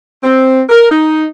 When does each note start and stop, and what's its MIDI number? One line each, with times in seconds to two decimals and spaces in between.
0.23 0.61 60
0.69 0.86 70
0.89 1.24 63